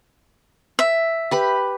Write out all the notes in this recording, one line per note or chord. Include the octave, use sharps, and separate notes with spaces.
E5
G4 B4 B5